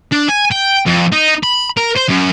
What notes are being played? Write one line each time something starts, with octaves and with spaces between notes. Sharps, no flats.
D4
G#5
G5
F2
D#4
B5
A#4
C5
F#2